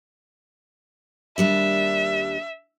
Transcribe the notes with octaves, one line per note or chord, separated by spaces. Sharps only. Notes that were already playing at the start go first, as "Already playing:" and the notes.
D#2 G3 D4 E5